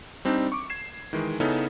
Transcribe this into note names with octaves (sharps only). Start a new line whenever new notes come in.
G3 C4 D4 D#4
C#6 D6
G#6 C7 E7
D#3 E3 G#3
C#3 B3 C#4 D#4 E4 A4